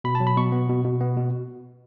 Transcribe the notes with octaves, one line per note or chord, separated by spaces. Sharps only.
B2 B5
A5
F#3
B5
B2 C#6
B3
B2
B2
B3
B2